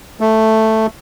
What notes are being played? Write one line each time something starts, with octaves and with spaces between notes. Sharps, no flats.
A3